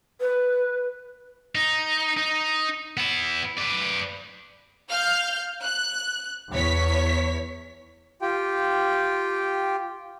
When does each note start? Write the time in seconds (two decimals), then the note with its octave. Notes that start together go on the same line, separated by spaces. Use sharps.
0.21 B4
1.55 D#4
2.17 D#4
2.97 B3 E4
3.59 B4 D5
4.89 F5 F6 G6
5.61 F#6
6.51 E2 C#5 B6
8.22 F4 G4 G5